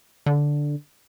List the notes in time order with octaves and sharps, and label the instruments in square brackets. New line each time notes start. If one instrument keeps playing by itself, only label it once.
[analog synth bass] D3